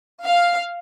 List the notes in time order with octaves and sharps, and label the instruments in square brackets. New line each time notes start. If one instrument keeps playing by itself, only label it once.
[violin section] F5